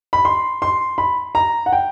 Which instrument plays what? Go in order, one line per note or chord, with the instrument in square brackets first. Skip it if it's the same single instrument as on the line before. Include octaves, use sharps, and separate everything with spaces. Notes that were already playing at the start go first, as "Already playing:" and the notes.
[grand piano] B5
C6
C6
B5
A#5
F#5
G5